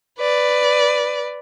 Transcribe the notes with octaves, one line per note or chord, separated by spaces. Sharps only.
B4 D5